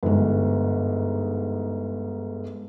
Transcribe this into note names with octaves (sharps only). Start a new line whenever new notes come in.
G1 G#2